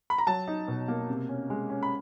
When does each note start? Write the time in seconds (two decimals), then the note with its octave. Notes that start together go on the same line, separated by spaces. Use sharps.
0.10 B5
0.18 A#5
0.27 F#3 A5
0.48 D#4
0.68 B2
0.88 A#3
1.09 C3
1.29 C#4
1.50 G#3
1.70 C#4
1.83 B5